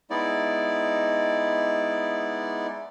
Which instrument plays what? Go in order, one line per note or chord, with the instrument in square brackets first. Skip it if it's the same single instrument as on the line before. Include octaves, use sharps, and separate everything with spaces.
[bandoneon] G#3 B3 D#4 E4 D5